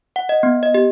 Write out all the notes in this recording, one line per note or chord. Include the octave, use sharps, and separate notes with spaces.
F#5
D#5
B3
D#5
G4